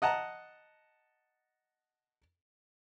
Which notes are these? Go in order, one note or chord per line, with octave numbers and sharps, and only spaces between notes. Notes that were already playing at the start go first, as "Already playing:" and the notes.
D#5 F#5 A5 A#5